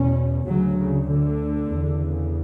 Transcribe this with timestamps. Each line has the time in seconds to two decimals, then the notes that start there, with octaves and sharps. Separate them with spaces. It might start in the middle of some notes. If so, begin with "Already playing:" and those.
Already playing: E2 B2 C#4
0.45 D2 C#3 F#3
0.77 C#3
1.09 D3
1.72 E2 C#3